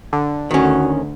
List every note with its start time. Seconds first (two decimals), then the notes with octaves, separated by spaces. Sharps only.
0.13 D3
0.51 D2 D#3 C#4 F#4